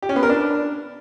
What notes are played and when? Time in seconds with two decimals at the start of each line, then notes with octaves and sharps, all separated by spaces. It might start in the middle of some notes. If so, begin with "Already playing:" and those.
0.02 G4
0.09 C#4
0.16 B3
0.23 A#4
0.29 D4